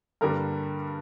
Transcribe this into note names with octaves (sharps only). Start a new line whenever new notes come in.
G2 D3 G3 A#3 A#4